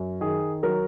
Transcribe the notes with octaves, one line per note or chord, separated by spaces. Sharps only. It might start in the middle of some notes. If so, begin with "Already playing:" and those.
Already playing: F#2
D#3 G#4
F#3 A#4